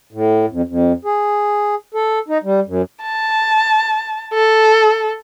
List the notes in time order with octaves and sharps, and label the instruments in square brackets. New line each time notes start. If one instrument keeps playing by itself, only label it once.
[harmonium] A2
F2
F2
G#4
A4
D#4
G3
F#2
[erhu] A5
A4